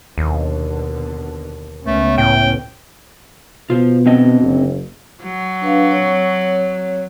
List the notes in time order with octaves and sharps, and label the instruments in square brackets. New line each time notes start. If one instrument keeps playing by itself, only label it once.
[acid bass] D#2 [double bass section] B2 D3
[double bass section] C#2 B3 C#4 [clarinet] A3
[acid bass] A2 [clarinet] G5
[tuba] B2 [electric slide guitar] F4 C5
[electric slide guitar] D3 C4 D#5
[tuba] F#1
[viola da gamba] F#3
[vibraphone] D4 B4 F5
C4 C#5